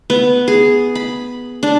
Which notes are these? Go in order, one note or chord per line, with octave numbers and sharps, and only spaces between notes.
B3
G#4
B5
D4